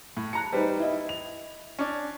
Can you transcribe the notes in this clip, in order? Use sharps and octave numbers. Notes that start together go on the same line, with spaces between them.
A2
A5 A#5 F#6 C#7
G3 D#4 B4 C5
E4 D#5 E5
F7
C#4 D4